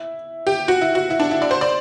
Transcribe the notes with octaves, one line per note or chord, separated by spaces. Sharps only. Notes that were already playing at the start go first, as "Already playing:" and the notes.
Already playing: E4
G4
F#4
E4
F#4
E4
D4
E4
D5
C5
D5